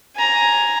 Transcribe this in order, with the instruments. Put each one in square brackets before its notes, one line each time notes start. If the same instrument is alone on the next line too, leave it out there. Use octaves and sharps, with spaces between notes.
[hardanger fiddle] G#5 A#5